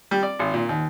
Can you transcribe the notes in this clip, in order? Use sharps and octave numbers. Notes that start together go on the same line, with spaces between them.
G3
D5
G#1
A#2
D#2